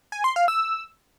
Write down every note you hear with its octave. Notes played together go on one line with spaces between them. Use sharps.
G#5
C6
F5
E6